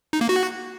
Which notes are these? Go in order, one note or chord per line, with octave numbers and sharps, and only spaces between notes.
D#4
A#3
F#4